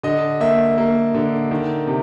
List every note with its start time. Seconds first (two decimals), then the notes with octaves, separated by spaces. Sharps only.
0.03 D3 D#5
0.40 A#3 E5
0.78 A#3
1.15 D3
1.51 D#3
1.87 C3